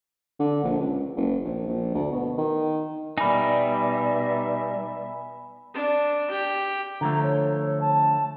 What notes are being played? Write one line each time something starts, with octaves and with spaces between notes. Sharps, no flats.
D3
A#1
C#2
F#1
A#1
A#1
D2
B2
D#3
B2 G3 D#4 D5 E5 G#5 B5
D4
G4
D3 F3 A3 A#5
C#5
C#5
A5